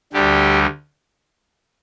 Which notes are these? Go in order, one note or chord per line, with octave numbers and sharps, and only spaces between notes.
D2 D3 G3 G4